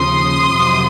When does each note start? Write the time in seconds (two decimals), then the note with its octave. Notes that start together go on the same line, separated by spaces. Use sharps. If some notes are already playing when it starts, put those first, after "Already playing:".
Already playing: D#2 C#3 F3 C6 D#6
0.57 F2 C3 D#3 F#3